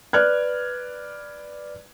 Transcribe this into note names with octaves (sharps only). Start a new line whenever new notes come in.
B4 D5 F6 F#6 G#6